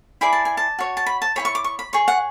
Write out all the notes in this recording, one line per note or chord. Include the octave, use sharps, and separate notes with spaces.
E4 G#4 D5 B5
A5
G#5
A5
F#4 C#5
A5
B5
A5
E4 G#4 C#5 B5
C#6
D6
C#6
B5
G#4 C#5 C#6
F#5